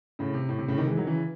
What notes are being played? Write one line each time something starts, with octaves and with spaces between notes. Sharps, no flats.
A2 C#3
C3
A2
C3
A2 C#3
C3 D#3
E3 G#3
D#3 F#3
C#3 E3